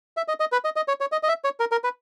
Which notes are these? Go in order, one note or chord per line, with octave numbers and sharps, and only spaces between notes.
E5
D#5
D#5
B4
D#5
D#5
C#5
C#5
D#5
D#5
E5
C#5
A#4
A#4
B4